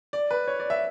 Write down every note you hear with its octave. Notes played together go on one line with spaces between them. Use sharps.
D5
B4
C#5
D5
E5